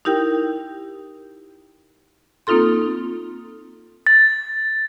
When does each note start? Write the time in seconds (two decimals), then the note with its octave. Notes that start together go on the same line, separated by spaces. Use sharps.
0.05 D#4 E4 G4 A#4 G5
2.47 A#3 C4 D#4 F4 A4 C6
4.07 A6